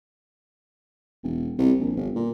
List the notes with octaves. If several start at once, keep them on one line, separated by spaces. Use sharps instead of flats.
E1
C2
A#1
G1
A#2